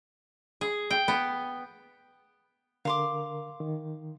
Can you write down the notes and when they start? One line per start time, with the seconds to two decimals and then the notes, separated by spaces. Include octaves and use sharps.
0.61 G#4
0.91 G5
1.08 B3
2.85 D3 A#4 F5 C6 D6
3.60 D#3